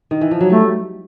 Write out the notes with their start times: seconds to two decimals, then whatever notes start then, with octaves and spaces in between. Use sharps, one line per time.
0.11 D#3
0.21 E3
0.31 F3
0.40 F#3
0.50 G3 A3